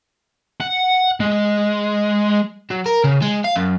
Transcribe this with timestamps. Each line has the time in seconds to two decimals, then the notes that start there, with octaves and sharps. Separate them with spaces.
0.60 F#5
1.20 G#3
2.71 F#3
2.86 A#4
3.04 C#3
3.22 G#3
3.45 F5
3.56 F#2